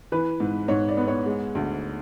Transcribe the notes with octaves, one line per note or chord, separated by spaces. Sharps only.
E3 B4
G#2
G#2 C#5
D5
B3
C#5
G#3
D2